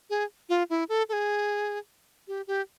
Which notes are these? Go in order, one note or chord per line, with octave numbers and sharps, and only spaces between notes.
G#4
F4
E4
A4
A4
G#4
G4
G4